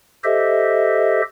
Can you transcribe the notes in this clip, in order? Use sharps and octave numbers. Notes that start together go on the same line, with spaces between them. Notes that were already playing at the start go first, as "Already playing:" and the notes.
G4 A4 C5 D#5 E5